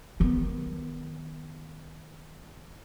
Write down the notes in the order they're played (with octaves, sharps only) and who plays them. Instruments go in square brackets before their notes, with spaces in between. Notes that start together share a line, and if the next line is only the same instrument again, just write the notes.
[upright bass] D#3 B3